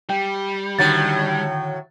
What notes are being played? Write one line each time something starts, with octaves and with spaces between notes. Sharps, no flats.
G3 G5
A2 D3 D#3 F#3 A6